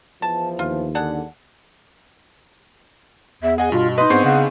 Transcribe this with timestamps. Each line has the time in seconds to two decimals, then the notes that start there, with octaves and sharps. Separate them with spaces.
0.22 E2 E3 F3 A5
0.59 D#2 F4
0.95 D3 D4 G#4 F#5
3.43 E2 E5
3.58 G#4 D#5 F#5 G#5
3.72 G2 B2 F4
3.98 D#4 B4 D#5 C6
4.10 G#2 B3 C4 D4 G#4 C5 C#6
4.24 C#3 F#5